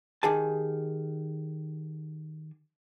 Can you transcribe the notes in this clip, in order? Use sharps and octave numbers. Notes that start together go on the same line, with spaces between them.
D#3 G4 G#4 G#5 A5